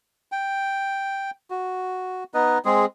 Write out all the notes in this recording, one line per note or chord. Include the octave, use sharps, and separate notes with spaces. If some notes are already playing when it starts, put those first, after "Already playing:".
G5
F#4
B3 D#4 B4 D#5
G#3 C4 G#4